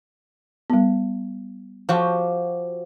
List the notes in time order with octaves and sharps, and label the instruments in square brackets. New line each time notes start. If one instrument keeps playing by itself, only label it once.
[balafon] G3 B3
[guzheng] F3 F#4 G4